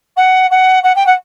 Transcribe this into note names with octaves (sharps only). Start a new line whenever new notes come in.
F#5
F#5
F#5
G5
F#5